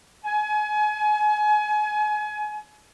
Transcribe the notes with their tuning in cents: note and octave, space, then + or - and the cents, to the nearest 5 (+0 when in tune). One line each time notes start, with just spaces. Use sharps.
G#5 +30